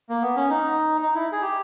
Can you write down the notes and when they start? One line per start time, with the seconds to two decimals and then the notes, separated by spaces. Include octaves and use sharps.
0.09 A#3
0.22 B3
0.36 C#4
0.50 D#4
1.03 D#4
1.15 E4
1.32 G#4
1.42 G4